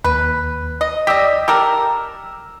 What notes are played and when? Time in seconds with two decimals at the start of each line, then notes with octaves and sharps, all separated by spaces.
0.04 D#2 B4
0.81 D#5
1.07 G4 D5 D#5 E6 B6
1.48 G4 A4 A#4 E6